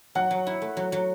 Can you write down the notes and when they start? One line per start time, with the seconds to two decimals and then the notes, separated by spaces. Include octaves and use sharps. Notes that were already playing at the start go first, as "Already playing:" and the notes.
0.15 F#3 F#5
0.31 F#3
0.47 E4
0.62 A3
0.77 F#3
0.92 F#3